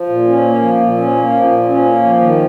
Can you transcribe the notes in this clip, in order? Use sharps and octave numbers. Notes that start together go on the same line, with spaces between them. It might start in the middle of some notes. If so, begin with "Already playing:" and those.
Already playing: F3
A#2
C#4
A#3
F3
A#2
C#4
A#3
F3
A#2
C#4
A#3
F3
D#3